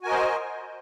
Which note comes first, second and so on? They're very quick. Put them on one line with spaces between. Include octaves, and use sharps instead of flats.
F#4 G#5 A#4 D#5 C5